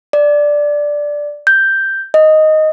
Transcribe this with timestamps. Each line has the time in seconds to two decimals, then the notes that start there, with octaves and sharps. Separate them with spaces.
0.13 D5
1.47 G6
2.14 D#5